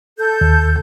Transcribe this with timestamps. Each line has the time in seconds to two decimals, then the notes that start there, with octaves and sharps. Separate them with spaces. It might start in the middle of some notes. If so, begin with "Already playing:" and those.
0.18 A4 G6
0.41 D#2